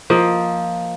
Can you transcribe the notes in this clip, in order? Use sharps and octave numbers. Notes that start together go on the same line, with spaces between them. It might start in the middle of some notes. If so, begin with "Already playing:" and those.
F3 A#3 D#5